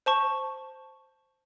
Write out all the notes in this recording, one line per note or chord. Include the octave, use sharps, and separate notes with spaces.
C5 A5 C#6